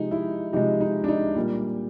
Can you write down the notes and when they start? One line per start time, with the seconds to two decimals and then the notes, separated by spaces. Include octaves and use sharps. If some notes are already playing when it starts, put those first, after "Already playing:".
Already playing: C3 F3 G#3 D#4
0.11 E4
0.53 C3 F3 G#3 D#4
0.81 D#4
1.04 D4
1.08 D#4
1.36 A#2 G3 A#3